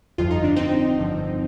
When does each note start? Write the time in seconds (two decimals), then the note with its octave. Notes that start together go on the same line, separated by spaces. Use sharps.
0.18 G1 F2 D3 F3 F4
0.31 D#4
0.44 D4
0.56 C4 D#4
0.97 G1 G2 D3 F3